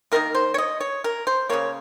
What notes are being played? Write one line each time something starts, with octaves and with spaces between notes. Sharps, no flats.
D#3 G3 A#3 A#4
C5
C#5
D#5
C#5
A#4
C5
C#3 G3 A#3 C#5